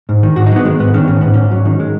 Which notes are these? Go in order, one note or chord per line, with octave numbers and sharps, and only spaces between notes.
G#2
D#3
G#2 F#4
D#4
F#3 B3
D#3 G#3
G#2 B3
D#3 C#4
G#2 C#4
G#2 B3
G#2 C#4
F#3
D#3
G#3